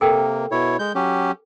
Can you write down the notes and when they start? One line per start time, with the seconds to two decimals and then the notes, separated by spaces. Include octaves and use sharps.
0.01 C3 A#3 A4 A#4 G5
0.51 B2 E4 C#5
0.79 G#3 G6
0.95 F#3 C#4 G4